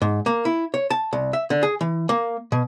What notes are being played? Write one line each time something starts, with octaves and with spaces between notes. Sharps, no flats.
G#2
A#3
E4
C#5
A5
C2
E5
D3
G#4
E3
A#3
B2